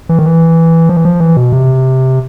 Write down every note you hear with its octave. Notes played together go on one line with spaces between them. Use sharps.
E3
D#3
E3
F3
E3
F3
E3
B2
C3